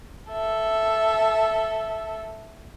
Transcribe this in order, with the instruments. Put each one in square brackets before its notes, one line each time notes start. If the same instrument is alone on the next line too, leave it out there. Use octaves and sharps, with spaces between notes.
[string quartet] A4 E5